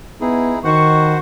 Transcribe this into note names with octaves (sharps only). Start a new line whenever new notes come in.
B3 D#4 E4 G#4
D#3 F#4 C5 F#5 C#6